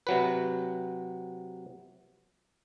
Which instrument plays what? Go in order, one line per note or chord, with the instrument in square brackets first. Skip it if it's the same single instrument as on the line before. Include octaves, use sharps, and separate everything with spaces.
[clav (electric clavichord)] C3 F#3 B4